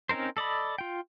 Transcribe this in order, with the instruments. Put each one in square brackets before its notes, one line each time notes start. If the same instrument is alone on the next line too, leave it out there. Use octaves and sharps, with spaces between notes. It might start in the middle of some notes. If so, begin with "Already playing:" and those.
[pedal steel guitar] C4 C#4 D#4 A#4 C5
A4 D5 D#5 B5
F4 G5